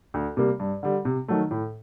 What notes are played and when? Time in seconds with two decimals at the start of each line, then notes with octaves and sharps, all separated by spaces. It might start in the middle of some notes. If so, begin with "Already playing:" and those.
0.14 D2
0.37 C3 G3 A#3
0.60 G2
0.83 D3 G3
1.05 C3
1.28 D#3 F#3 A3
1.51 A2